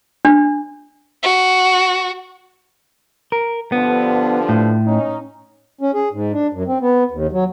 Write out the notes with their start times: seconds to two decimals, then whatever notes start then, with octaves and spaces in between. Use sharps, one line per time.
0.25 D4
1.23 F#4
3.32 A#4
3.72 G2 D3 F3 B3
4.49 A2
4.85 C#4 D#4
5.81 C#4
5.94 G#4
6.13 G#2
6.33 D4
6.53 F#2
6.67 C4
6.81 B3
7.11 D#2
7.32 F#3